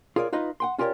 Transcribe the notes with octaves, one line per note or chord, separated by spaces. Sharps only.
F4 G#4 A#4 C#5 D5
D#4 F4 B4 D#5
F#5 G5 C6
C#4 F4 G4 A#4 C#5 D5